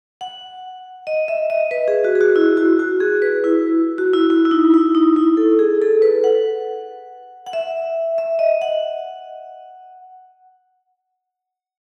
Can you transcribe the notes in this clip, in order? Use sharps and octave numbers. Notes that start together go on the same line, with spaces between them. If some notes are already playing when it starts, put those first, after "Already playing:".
F#5
D#5
E5
D#5
B4
G#4
F#4
G#4
F#4
E4
F#4
F#4
G#4
B4
E4
F#4
E4
E4
E4
D#4
E4
D#4
E4
A4
G#4
A4
B4
F#5
F#5
E5
E5
D#5
F#5